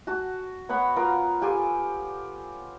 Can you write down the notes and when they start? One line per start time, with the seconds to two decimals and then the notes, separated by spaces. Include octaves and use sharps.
0.07 F#4 A5
0.69 B3 C#5 F#5 B5
0.96 B3 F4 A#4 F5
1.42 F4 G4 A4 G#5